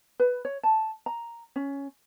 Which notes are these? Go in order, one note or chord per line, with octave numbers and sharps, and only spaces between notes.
B4
C#5
A5
A#5
C#4